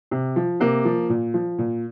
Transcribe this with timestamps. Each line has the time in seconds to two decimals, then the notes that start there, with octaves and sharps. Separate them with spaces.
0.11 C3
0.36 F3
0.60 C3 A#3
0.85 F3
1.09 A#2
1.34 F3
1.58 A#2